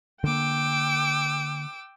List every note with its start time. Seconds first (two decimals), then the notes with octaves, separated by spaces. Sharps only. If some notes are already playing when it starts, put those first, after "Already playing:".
0.24 D3 A#3 G5 D6 E6